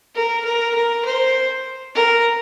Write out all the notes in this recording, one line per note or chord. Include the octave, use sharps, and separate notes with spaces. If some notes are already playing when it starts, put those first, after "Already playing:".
A#4
A#4
A#4
C5
A#4